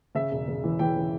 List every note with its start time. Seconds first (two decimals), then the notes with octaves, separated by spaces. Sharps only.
0.15 C#3 E5
0.31 E1
0.48 C#3
0.64 E3
0.79 E3 G5
0.96 C#3